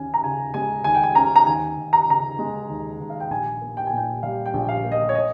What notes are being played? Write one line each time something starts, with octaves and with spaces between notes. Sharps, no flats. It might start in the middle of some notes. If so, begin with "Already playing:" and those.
Already playing: D#2 C#4 G#5
A#5
C#3 G#5
G#3 G#5
D#2 G#5
G5
G#5
C#4 A#5
A#5
D#2 G#5
D#2
A#5
C#3 A#5
G#3
D#2
D#2
F5
G5
A#1 G#5
A#3
G5
G#5
A#2 G5
G3 F5
G5
A#1
F5
A#3
D#5
C#5
D#5